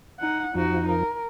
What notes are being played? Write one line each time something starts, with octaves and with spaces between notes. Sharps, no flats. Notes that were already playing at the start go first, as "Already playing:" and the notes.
D#4 F#5
F2 F3 D#4 F#4
A#4